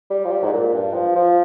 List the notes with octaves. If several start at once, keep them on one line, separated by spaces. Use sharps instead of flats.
G3
F3
G3
G#2
A#2
G2
F3
F3